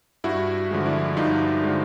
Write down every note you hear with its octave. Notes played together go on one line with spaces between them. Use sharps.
G2 E4 F#4
D3 F3 G#3
D4 E4
G2 D#4 F4
D3 F3 G#3